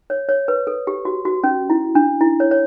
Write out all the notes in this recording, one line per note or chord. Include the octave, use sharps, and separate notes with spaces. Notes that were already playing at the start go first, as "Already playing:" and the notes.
C#5
C#5
B4
A4
G4
F#4
F#4
C#4
E4
D4
E4
C#5
C#5